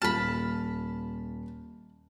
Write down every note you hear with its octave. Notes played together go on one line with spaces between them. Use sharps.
D#1 F4 A5 B5 F6